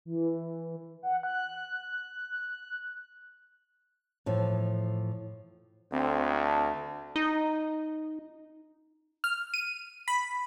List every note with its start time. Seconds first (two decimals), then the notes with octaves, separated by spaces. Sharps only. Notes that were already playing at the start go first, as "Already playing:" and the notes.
0.05 E3
1.03 F#5
1.23 F#6
4.26 A2 E3 F3
5.92 D2 C4
6.44 A5
7.16 D#4
9.24 F6
9.54 D#7
10.08 B5